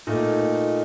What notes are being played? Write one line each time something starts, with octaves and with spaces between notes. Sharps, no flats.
A#2 A3 D#4